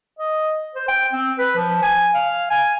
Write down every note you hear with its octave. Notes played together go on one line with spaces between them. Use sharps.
D#5
C5
G5
C4
B4
F3
G#5
F5
G#5